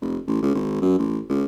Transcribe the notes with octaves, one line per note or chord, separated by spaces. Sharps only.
F1
A1
C#2
G#1
F#2
A1
C#2